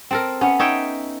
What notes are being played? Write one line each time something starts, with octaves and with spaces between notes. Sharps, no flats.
C4 A4 A#4
B3 C#4
D#4 C#5 E5 G5